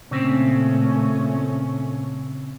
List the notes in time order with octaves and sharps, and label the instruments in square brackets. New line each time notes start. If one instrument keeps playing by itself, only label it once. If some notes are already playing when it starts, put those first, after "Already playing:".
[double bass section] A#2 A3 C#4 [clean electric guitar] C#3 C4